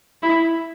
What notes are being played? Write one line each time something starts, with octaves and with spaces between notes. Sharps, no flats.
E4